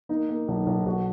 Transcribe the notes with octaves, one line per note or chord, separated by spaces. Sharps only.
A#3 D#4
A#3
B1
B1
B1 F#4